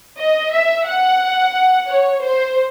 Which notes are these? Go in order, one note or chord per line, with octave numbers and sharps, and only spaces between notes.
D#5
E5
F#5
C#5
C5